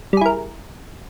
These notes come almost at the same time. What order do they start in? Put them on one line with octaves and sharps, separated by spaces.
G3 G#4 E4 A#4